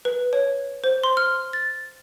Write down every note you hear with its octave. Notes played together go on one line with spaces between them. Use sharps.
B4
C#5
C5
C6
F6
A6